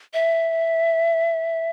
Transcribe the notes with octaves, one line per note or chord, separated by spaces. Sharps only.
E5